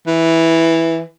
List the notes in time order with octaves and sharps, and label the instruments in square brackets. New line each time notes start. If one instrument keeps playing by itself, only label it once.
[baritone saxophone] E3